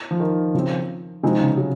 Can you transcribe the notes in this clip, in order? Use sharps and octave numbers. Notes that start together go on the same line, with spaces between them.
F3
D#3
C#3 F3 C4
C3 F3 G#3 C4 D#4 G#4
C#3
F#3